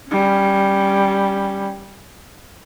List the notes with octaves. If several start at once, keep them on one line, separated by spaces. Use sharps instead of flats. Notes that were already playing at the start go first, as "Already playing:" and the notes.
G3 C#4